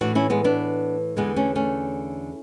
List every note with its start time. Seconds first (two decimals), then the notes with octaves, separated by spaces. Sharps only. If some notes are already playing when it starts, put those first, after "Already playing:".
0.01 A2 E3 D4 F#4
0.15 C#4 E4
0.30 G#3 B3
0.44 B3 D4
1.17 E2 D3 G#3 B3
1.36 A3 C#4
1.55 A3 C#4